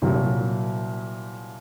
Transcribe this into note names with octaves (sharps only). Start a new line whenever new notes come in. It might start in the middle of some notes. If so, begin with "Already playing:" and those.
C2 A#2 F#3